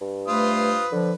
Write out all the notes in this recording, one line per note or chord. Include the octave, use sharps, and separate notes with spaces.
G2
A3 F4 B4 C5 D#6
D3 F3